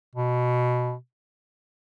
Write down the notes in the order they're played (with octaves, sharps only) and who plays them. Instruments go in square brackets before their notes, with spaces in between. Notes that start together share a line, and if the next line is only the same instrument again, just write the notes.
[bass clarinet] B2